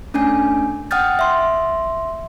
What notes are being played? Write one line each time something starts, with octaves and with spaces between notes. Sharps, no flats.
A3 C#4 D4 G#5 G6
F#5 G5 D#6 F6 G6 A6
E5 C6